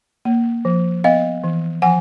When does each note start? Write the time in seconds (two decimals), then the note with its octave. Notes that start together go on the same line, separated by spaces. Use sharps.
0.25 A#3
0.65 F3
1.04 B3 D#5 F5
1.44 E3
1.82 F3 F#5 G#5